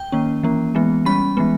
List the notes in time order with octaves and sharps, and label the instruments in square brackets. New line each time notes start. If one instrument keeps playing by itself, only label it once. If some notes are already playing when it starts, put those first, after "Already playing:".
Already playing: [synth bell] G5
D#3 A#3 C#4
E3 A#3 C#4
E3 G#3 B3
G3 C#4 B5
E3 G#3 B3